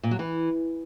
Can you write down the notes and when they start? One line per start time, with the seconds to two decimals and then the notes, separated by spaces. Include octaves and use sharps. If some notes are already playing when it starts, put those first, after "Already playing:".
0.03 A#2
0.11 F#3
0.19 E3